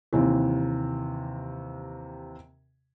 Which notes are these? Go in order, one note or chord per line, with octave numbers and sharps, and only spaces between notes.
D#2 C3 E3